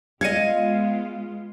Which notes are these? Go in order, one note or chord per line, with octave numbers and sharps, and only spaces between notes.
G#3 B3 F4 D#5 F5 G#6 C#7 D#7